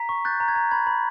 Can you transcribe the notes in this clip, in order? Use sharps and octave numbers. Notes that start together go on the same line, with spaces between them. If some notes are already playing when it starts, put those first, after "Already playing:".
Already playing: A#5 B6
C#6
F#6 G6 A6
A#5
G#6
A#5
B5 G#6
B5